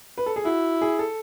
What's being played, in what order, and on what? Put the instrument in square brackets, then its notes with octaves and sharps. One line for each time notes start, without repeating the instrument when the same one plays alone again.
[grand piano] B4
A4
G#4
[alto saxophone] E4 [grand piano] F#4
[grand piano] G#4
A4